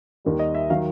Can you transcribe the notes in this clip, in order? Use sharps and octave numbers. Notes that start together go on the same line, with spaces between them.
D#2 D#3 G3
D#5
E5
D#3 F#3 F5